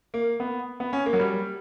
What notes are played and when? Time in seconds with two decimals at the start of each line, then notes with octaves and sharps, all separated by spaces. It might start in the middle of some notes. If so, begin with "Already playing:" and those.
0.14 A#3
0.40 B3
0.80 B3
0.93 C#4
1.06 A#3
1.13 F#3
1.20 G3